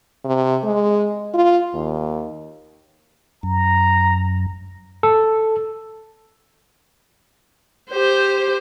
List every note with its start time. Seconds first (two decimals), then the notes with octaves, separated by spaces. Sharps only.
0.24 C3
0.64 G#3
1.34 F4
1.74 D#2
3.43 F#2 A#5
5.03 A4
7.90 G4 C5